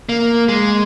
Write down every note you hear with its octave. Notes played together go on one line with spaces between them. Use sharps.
A#3
G#3